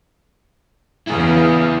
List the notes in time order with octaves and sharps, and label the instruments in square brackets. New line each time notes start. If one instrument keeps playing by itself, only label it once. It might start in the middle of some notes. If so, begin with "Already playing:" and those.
[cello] E2 C#3 [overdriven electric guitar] E4 G#4